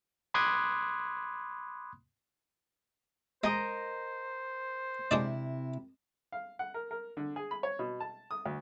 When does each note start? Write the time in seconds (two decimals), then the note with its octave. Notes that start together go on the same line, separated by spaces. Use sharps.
0.34 B5 C6 D6 D#6 F#6 G#6
3.44 G#3 A#4 C5 D#5 A#5
5.11 C3 G#3 D4 E4 D5
6.32 F5
6.59 F#5
6.74 A#4
6.91 A#4
7.17 D3
7.36 G#4
7.51 B5
7.63 C#5
7.79 B2
8.00 A5
8.31 D#6
8.46 D2